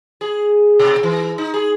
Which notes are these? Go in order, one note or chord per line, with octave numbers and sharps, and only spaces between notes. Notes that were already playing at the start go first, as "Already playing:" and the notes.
G#4
B2
E3
D#4
G#4